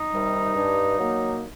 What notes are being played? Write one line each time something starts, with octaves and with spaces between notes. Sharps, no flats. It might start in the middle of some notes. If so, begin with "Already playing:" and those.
Already playing: D#4
C3 D#3 G3
G2
F#3 A#3